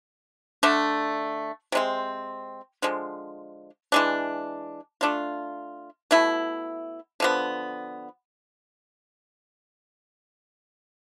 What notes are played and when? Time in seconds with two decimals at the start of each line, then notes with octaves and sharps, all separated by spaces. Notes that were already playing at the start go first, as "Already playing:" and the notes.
0.63 D3 A3 D4
1.72 C3 G#3 C4
2.82 D3 F3 G#3
3.92 E3 G#3 D4
5.01 A3 D4 F4
6.11 B2 A3 E4
7.20 D3 F3 B3